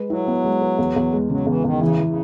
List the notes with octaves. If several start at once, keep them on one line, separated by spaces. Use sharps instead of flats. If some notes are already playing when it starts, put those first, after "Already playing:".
Already playing: G#3 B4
F#3 E4
B3
G#3
B4
E2
E2
G#3
C#3 F#3
E2 E3
E2 D#3
C#3 E3
E3
C#3